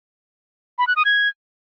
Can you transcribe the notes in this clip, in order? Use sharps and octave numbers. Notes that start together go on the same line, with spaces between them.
B5
F#6
D#6
G#6